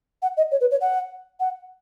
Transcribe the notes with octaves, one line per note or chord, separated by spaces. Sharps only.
F#5
D#5
C#5
B4
C#5
F#5
F#5